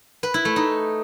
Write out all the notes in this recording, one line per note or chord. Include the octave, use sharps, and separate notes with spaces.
B4
E4
A3
D#4